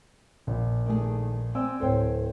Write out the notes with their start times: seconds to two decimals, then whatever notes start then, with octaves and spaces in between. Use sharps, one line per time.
0.47 A#1
0.86 D#3 A3 G#4
1.55 C4 D5 G#5 E6
1.80 D1 A4 C5 C#5 G5